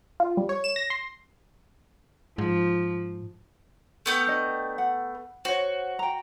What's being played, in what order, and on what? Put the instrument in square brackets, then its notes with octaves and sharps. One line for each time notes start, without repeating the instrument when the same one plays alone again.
[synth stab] F4
G3
C#5
E7
A#6
C6
[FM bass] G#2 [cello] F3
[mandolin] A3 B3 G5
[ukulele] D4 D#5
F#5
[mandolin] F#4 [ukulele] C5 C#5
[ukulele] G5 A#5